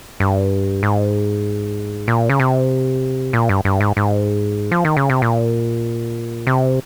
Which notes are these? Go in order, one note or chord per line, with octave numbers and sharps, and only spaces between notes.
G2
G#2
A#2
C#3
C3
A#2
G2
G2
G#2
G#2
F3
D#3
C#3
C3
A#2
C3